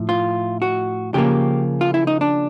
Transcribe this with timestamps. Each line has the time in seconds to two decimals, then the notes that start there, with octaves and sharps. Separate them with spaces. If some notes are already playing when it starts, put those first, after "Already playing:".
Already playing: A2 F3
0.09 F4
0.62 F#4
1.14 C#3 F3 A#3 G4
1.81 F4
1.94 E4
2.07 D#4
2.21 D4